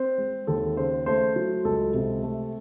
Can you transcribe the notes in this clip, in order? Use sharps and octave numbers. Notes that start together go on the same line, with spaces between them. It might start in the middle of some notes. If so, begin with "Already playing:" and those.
Already playing: C4 C5
G#3
D#2 A4
C#3 C5
A3 C5
F#3
C#2 A4
C3
A3